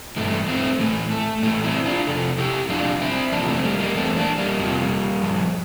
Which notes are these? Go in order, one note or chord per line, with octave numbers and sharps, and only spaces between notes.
G2 E3 A3
A3 C4
A2 E3 A3
A3
A2 E3 A3
C4 E4
D4 F4
F2 C3 A4
E4 G4
F2 C3 F3 D4 F4
C4 E4
E2 C3 F3 A#3 D4
A3 C4
G3 A#3
G3 A#3
E2 E3 A3 C4
A#3 D4
G3 A#3
F2 C3 F3
G2 F3